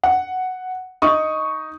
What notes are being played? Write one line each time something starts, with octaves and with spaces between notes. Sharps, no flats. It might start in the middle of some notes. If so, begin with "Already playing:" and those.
F#5
D#4 C#6 D#6